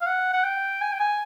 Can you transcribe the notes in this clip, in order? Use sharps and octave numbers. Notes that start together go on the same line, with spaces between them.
F5
F#5
F#5
G5
G#5
G5
G#5